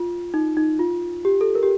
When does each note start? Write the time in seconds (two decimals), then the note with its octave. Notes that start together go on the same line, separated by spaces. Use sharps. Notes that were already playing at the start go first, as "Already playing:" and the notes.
Already playing: F4
0.34 D#4
0.57 D#4
0.79 F4
1.25 G4
1.41 A4
1.55 A#4
1.63 G4